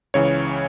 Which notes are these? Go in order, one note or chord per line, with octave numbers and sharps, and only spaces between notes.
C#2 C#3 E3 C#5